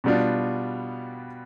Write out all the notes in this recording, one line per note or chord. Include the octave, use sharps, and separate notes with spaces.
B2 G3 B3 D4 F4